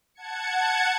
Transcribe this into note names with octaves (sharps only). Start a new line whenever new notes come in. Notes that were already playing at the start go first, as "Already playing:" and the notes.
F#5 A5 G#6 C#7